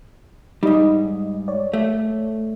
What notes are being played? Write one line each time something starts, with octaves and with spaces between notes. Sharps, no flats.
G#2 G3 D#4 D#5
C#5 D5
A3